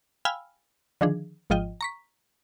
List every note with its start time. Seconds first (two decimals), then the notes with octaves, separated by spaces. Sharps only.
0.25 F5 G5 G#5 B5 E6 F6
1.01 D3 D#3 F3 D4 G#4
1.50 G#1 G#2 F3 F4 D#5 G5
1.81 A#5 C#6 B6